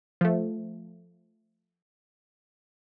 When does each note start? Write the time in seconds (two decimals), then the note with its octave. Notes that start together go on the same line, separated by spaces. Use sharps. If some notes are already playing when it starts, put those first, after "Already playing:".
0.21 F3 A3